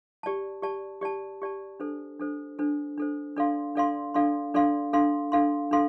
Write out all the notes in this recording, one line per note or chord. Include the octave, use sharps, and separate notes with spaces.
G4 D5 A5
G4 D5 A5
G4 D5 A5
G4 D5 A5
D4 A4 C5
D4 A4 C5
D4 A4 C5
D4 A4 C5
D4 A4 D5 F5 C6
D4 A4 D5 F5 C6
D4 A4 D5 F5 C6
D4 A4 D5 F5 C6
D4 A4 F5 C6
D4 A4 F5 C6
D4 A4 F5 C6